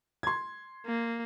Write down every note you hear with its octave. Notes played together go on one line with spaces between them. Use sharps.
C6 G#6
A#3